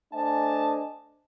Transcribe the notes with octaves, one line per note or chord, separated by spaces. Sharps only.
A3 D4 C5 D#5 G#5 A5